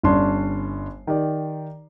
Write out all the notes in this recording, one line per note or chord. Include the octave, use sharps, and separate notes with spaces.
G1 C#4 D4 C6
D#3 G4 D5